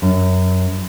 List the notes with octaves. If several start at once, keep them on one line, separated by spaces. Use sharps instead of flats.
F#2